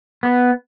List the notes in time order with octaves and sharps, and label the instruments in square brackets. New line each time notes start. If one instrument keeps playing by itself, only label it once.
[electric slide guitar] B3